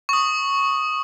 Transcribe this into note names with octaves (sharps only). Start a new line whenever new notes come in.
C#6 D#6